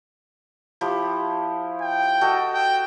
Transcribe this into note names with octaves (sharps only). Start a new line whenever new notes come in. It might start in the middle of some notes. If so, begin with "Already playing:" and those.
F3 E4 G4
G5
F#4 A4 D#5
G5